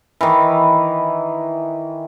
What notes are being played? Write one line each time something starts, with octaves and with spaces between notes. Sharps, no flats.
D#3 E3